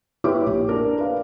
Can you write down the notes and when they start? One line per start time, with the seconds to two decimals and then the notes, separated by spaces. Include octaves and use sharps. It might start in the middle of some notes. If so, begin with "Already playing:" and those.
0.24 E4 G4 B4 C#5 E5 D6
0.46 A#1
0.69 D4 A#4
0.98 B4 F5